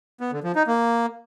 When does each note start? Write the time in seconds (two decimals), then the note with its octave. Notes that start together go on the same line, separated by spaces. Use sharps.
0.21 B3
0.32 D3
0.44 F3
0.55 D#4
0.67 A#3